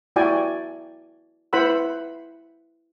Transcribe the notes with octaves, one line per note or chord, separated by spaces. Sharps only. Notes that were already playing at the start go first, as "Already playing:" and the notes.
E4 F#4 D5 G5 G#5
E4 B4 C5 F#5 B5 E6